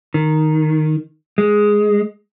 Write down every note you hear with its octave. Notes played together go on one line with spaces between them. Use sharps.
D#3
G#3